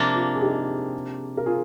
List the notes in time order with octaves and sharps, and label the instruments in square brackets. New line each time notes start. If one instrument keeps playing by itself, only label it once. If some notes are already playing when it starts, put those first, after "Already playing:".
Already playing: [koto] C3 F3 A#3 D4
[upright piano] F4
G#4
D#4 G4
A#4
F4 G#4